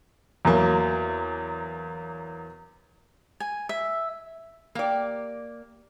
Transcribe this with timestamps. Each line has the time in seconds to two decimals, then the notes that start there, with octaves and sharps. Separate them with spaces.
0.45 E2 F#3 A#3
3.40 G#5
3.69 E5
4.75 A#3 G4 D5